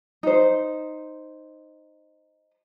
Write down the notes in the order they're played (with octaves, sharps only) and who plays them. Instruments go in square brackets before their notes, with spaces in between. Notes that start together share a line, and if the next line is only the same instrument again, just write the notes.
[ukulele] D#4 C5